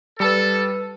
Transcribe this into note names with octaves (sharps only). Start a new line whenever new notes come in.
G3 A4 B4 A5 E6